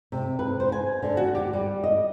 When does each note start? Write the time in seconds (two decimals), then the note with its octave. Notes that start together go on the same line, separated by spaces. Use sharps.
0.12 C3
0.39 B4
0.60 C5
0.72 G#5
1.03 D3
1.17 F#4
1.35 G4
1.53 G3
1.84 D#5